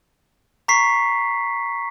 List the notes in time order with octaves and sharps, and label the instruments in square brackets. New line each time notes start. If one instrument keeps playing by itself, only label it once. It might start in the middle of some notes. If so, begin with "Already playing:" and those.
[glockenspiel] A#5 C#6 B6 C7